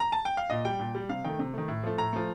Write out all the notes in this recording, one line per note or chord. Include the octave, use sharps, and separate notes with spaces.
A#5
A5
G5
F5
A#2 D#5
G3 G5
A#2
G3
C3 F5
D#3 A3 G5
C3
D#3 A3
A2
F3 A3
A2 A#5
F3 A3